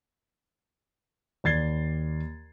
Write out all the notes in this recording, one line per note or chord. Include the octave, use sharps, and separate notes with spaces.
D#2 D5 G#6 A6 C7 G7